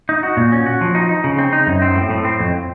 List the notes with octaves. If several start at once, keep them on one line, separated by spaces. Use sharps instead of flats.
D#4
F#4
A#2
C#4
F#4
F3
D#4
D#4
C#3
C4
D#4
F#2
C4
A2
A2
C4
F2